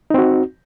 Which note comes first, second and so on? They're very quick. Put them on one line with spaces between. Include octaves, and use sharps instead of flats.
D#4 C4 F#4